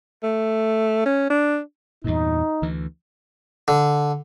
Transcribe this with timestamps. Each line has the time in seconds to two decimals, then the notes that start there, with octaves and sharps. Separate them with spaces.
0.23 A3
1.06 C#4
1.30 D4
2.04 E2 G2 A#2 D#4
2.62 D2 E3
3.68 D3